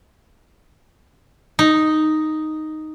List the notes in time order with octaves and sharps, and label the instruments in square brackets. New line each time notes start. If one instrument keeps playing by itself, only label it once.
[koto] D#4